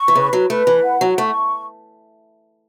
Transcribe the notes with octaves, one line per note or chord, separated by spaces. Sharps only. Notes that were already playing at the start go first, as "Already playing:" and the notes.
Already playing: C#6
E3
C#3 B4
F#3
A3 B4
E3
F#5
F#3
A3 C#6